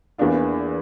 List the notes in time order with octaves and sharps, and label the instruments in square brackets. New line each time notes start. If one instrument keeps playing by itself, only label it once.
[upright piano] E2 E3 A#3 D4 F4